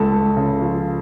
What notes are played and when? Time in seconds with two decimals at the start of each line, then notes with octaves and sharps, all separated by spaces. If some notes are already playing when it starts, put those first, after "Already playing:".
Already playing: C#2 A4
0.12 C#2
0.37 C#3
0.61 F3